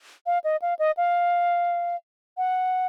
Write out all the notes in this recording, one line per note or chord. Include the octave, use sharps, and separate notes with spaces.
F5
D#5
F5
D#5
F5
F#5